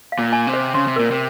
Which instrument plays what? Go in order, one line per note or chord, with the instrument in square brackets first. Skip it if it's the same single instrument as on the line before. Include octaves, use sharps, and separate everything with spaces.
[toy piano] F5
[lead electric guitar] A#2
[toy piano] G#5
[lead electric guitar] C3
[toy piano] C5
[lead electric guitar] C#3 [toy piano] C6
[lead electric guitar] C3
[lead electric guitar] A#2 [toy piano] A#4
[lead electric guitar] C3